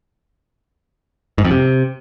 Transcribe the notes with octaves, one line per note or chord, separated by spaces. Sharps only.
G#2
F2
C3